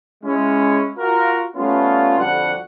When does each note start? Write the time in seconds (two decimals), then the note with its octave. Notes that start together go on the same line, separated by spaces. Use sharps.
0.24 G#3 C#4 E4
0.98 F4 F#4 A#4
1.56 G3 A3 B3 C#4 F4
2.19 F2 D3 G3 D4 F#4 F#5